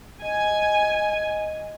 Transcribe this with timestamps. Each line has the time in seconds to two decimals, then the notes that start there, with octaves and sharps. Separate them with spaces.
0.22 D#5 G#5